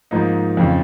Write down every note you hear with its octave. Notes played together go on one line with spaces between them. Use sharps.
G#2 F3 A#3 D#4
F2 C#3 F3